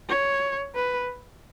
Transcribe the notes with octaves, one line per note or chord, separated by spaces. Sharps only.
C#5
B4